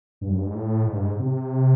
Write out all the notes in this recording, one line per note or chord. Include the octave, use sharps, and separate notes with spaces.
G2
F#2
G2
G#2
A2
G#2
G2
G#2
C3